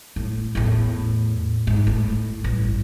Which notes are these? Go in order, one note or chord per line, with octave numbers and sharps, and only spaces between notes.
A2
E2 A2
G#2
A2
A1 G2